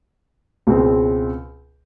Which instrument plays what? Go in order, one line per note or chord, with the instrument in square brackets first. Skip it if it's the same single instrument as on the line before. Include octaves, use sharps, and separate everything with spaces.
[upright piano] C#2 B2 G#3 C4